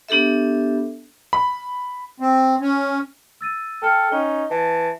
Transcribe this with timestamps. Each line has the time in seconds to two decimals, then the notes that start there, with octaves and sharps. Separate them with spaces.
0.09 B3 D4 G4 A4 E5
1.33 B5
2.20 C4
2.61 C#4
3.41 E6 A6 D#7
3.82 A4 G5 F6 C#7
4.12 C#4 D#4 G7
4.51 E3 A5